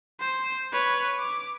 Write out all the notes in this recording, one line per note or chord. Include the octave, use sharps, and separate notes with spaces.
C5
B4 C#5
D6